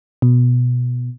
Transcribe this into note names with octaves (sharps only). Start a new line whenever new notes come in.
B2